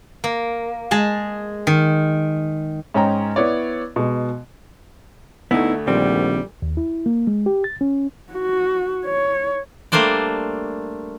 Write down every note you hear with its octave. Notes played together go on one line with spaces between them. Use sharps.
A#3
G#3 G#4 A5
D#3
G#2 C#4 D#4 G5 A#5
B3 E4 C#5 D5
B2 G#3
D2 A3 B3 D#4 E4
A#1 D#3 G3 C4
D#2
E4
A#3
G#3
G4
A6
C#4
F#4
C#5
G3 A3 A#3 D4 C5 D5